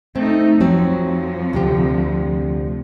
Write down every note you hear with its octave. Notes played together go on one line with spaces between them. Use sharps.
A3 C4 D#4
F2 F3 F#3 C4
D2 C3 G4